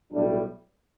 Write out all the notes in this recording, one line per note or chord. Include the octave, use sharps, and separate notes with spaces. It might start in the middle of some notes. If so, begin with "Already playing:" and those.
B1 A2 G3 D4